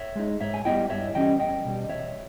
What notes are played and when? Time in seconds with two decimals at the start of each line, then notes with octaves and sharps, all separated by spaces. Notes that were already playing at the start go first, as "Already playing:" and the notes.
Already playing: C#5 E5
0.16 G#3 D#4
0.41 G#2 C#5 E5
0.54 G#5
0.65 G3 B3 E4 D#5 G5
0.90 G2 C#5 E5
1.15 E3 G3 C#4 D#5 G5
1.39 E2 D#5 G5
1.65 B2 G3
1.89 E2 C#5 E5